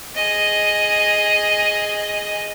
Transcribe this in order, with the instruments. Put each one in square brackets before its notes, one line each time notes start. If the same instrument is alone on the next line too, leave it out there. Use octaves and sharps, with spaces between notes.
[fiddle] G#4 D#5